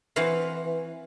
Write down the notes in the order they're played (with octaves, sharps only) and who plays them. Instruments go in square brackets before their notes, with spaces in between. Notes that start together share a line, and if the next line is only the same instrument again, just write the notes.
[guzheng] E3 C4 F#4 B4 F5